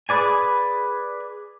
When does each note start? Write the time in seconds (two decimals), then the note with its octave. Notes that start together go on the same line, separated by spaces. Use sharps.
0.09 G#4 B4 D5 G#5